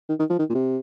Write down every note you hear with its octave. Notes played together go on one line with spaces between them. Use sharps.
D#3
D#3
F3
D#3
A#2
C3